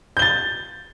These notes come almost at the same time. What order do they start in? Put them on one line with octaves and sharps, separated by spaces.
G6 G7 A6